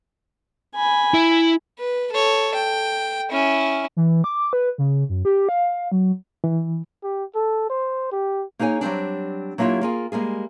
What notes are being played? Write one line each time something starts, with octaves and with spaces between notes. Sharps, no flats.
G#5 B5
E4
B4
A4 C#5
G5
C#4 E4
E3
D6
B4
C#3
F#2
G4
F5
F#3
E3
G4
A4
C5
G4
A#3 D#4 G#4 C#5 G#5
F#3 G3 C4 D4
F#3 A#3 D4 E4 F4 G4
A#3 F4 G#4
G3 G#3 A#3 G#4